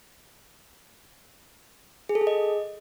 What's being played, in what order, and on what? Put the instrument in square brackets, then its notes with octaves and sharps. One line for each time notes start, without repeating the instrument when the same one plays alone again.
[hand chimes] G#4
A4
G#4
D#5